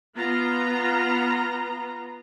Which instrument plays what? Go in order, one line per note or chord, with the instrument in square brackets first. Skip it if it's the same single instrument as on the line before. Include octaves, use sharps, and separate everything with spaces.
[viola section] B3 F4 A#5